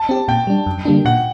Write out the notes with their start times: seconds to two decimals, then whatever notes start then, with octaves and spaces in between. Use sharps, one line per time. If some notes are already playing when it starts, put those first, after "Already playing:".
Already playing: A5
0.09 C4 G4
0.28 A#2 G5
0.47 G3 D4
0.66 F#2
0.85 D3 G3 A#3 D4
1.05 A#2 F#5